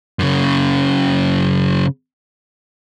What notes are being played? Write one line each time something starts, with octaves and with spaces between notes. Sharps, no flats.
F#2 C#3